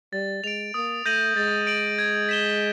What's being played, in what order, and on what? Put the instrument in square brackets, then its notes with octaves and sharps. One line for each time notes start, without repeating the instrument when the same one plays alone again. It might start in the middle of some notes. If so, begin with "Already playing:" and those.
[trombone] G3 [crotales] A6
[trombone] G#3 [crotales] D7 F7
[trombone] A#3 [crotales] D#6
[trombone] A3 [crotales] G6 A#6 D#7 F#7
[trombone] G#3 [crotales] A6
[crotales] D7 F#7
G#6
B6 E7 G7